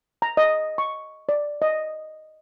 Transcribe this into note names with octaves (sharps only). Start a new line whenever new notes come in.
A#5
D#5
C#6
D5
D#5